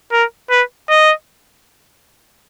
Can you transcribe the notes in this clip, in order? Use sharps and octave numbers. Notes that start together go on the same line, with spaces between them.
A#4
B4
D#5